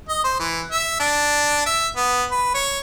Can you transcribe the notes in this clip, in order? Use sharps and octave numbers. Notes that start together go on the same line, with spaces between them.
D#5
C5
E3
E5
D4
E5
B3
B4
C#5